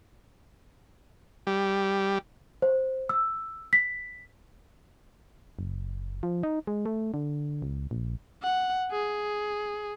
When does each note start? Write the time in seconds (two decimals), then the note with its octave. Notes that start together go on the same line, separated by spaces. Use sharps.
1.47 G3
2.62 C5
3.09 E6
3.73 B6
5.59 F#1
6.23 F3
6.43 D#4
6.67 G#3
6.86 A3
7.14 D3
7.62 C#2
7.91 A#1
8.43 F#5
8.91 G#4